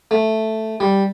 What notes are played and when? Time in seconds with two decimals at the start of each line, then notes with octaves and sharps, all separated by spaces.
0.11 A3
0.80 G3